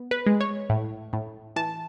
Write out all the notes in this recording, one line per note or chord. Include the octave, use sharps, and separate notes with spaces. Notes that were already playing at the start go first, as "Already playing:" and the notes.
Already playing: B3
B4
G#3
C#5
A2
A2
E3 A5